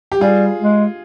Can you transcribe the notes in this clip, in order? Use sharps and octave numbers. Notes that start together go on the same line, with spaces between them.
G4
G3 F4 G#4
G#3